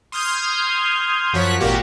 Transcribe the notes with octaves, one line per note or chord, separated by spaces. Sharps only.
C6 D#6 F6 G6 G#6
F#2 F3 F#4 C#5 F#6 B6
G#1 A#2 A#3 F#4 G4